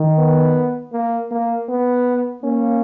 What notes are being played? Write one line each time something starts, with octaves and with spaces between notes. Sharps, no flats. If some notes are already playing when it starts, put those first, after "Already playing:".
Already playing: D#3
B3
A#3
A#3
B3
A#3 C#4